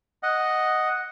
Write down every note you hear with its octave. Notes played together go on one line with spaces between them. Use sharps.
D#5 F#5